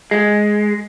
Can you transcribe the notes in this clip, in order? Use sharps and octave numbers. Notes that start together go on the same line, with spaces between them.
G#3